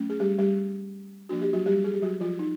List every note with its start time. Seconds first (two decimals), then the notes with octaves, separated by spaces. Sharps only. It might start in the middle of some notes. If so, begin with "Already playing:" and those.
Already playing: F#3 A3 C#4
0.10 G#4
0.20 G3 G4
0.39 G3 G4
1.29 F3 A#3 D4 F#4
1.41 G4
1.53 F#3 F#4
1.66 G3 G4
1.84 G#4
1.94 G4
2.02 F#3 F#4
2.20 F3 F4
2.39 D#4